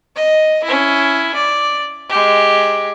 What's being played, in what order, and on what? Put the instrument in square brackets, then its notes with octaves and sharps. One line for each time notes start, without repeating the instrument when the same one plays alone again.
[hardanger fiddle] D#5
C#4 E4
D5
G#3 G4